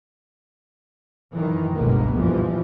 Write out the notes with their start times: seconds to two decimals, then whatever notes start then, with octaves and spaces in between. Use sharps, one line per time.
1.32 F#2 D#3 E3
1.73 G1 C#2 B2 G#3 A#3 B3
2.13 A#1 F2 E3 F3 G3